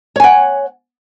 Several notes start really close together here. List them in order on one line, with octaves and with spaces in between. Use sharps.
C#5 G#5 F#5